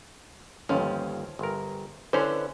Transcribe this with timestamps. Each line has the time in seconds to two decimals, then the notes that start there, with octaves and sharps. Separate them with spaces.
0.69 G1 D#2 F3 C#4
1.39 G1 A#4
2.13 D3 C#4 E4 B4 C5